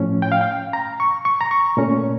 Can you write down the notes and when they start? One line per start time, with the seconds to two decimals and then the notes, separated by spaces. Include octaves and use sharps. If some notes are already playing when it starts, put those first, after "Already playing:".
Already playing: A2 F3 A3 C#4
0.22 G5
0.32 F5
0.41 G5
0.73 A#5
1.00 C#6
1.25 C#6
1.41 A#5
1.51 C#6
1.77 A#2 A3 C#4